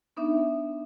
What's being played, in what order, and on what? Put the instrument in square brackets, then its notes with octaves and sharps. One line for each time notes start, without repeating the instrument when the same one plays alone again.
[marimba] B3 D4 D#4 E5